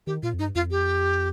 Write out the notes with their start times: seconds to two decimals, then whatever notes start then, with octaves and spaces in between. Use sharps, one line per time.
0.07 D#3 G4
0.23 A#2 F4
0.34 F2
0.39 G2 D#4
0.55 F2 F4
0.71 G4